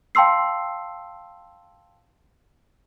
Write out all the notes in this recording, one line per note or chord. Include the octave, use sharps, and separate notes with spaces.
F5 G5 A5 C6 E6 C7